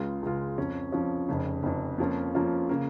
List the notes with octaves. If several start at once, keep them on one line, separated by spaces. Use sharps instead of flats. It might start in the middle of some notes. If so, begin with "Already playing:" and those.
Already playing: C#2 C#3 G#3 F4
C#2 C#3 G#3 F4
F2 F3 C#4
F2 F3 C#4
F1 F2 C#3
F1 F2 C#3
F2 F3 A#3 C#4 F4
F2 F3 A#3 C#4 F4
C#3 A#3